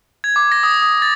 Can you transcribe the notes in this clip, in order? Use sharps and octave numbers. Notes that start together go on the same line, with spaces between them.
G#6
D6
A#6
D#6
D#6
A6